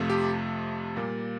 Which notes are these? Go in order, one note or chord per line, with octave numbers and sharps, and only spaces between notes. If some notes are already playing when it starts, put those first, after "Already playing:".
Already playing: F2 C3 F3 A3
G4
A#2 G3 A#3